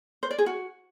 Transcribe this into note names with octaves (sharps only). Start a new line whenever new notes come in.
C5
D5
G#4
F#4